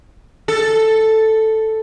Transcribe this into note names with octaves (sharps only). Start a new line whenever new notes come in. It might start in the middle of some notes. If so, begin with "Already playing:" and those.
A4